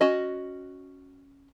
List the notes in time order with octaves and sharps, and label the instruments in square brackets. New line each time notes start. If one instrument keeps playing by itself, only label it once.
[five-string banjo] C#4 F#4 D#5